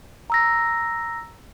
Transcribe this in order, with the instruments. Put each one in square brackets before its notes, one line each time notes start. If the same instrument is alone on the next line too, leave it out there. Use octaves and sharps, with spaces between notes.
[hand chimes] A#5 E6 A#6